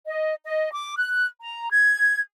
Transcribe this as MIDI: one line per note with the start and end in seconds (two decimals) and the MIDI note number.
0.07 0.33 75
0.43 0.71 75
0.72 0.94 86
0.98 1.27 90
1.41 1.70 82
1.71 2.20 92